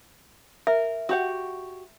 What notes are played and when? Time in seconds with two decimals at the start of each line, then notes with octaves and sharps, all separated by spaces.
0.67 A#4 E5
1.09 F#4 G4 F#5